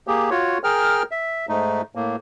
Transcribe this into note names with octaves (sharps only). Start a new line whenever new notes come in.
A#3 G4 G#4
F4 F#4 C#5
G#4 A#4 G5 F6
E5
G#2 A3 D#4
A2 A#3